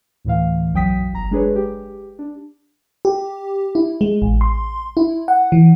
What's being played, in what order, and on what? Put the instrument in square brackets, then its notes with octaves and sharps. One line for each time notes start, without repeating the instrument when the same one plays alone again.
[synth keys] D2 A2 E3 F5
B1 F#2 F#3 G5 D#6 B6
G1 A#5
G#3 D4 G#4 B4 C#5
G4
D4
[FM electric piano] G4
E4
G#3
A1
C6
E4
F#5
E3